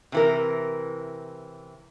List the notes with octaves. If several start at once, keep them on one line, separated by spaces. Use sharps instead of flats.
C3 E3 A#4